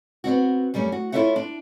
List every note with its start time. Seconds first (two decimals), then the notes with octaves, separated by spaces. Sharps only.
0.24 B3 C4 D4 F#4
0.74 F#2 G3 A3 C#4
0.92 F#4
1.12 E4 F4 A4 C#5 E5 F#5
1.36 D4